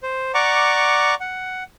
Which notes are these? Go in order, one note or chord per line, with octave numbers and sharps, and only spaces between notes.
C5
D5 F#5 A#5 C#6 D6
F#5